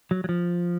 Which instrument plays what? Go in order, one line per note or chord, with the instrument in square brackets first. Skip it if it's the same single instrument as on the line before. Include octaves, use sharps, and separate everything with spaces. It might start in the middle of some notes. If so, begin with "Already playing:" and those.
[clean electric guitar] F#3
F#3
F3